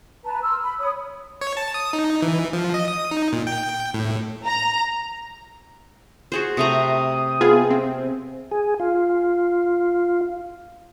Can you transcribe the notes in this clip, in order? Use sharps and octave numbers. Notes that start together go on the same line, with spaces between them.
B4 A5 A#5
C6 E6 F6
B5
C#5 B5 D#6
C#5
A5
D#6
D#4
E3
F3
D#5
D#6
D#4
A#2
G5
A2
A#5
F#4 G#4 C5
C3 A3 A#5 D#6
B3 F4 G#4
C4
G#4
F4